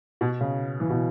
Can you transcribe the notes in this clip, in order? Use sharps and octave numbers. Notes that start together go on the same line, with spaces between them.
B2
C#3
E3
B2